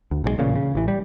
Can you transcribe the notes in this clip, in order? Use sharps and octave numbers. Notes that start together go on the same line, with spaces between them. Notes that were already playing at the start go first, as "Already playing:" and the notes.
D2
B1 D3 G#3
A1 A#2 C#3
C#3
A1 E3
G3